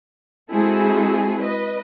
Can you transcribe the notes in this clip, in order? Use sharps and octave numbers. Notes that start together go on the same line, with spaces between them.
G#3 C4 E4 F#4 G#4 A4
B4 D#5